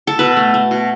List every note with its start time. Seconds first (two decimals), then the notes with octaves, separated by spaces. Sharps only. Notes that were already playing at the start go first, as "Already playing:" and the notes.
0.07 A4
0.19 B2 B4
0.36 A3
0.54 A3
0.71 B2